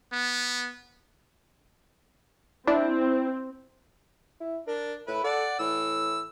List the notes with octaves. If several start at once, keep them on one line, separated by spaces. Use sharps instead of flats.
B3
C4 D4 E4
E4
D4 A#4
A2 E4 B4
A4 D5 F#5
A2 E3 E6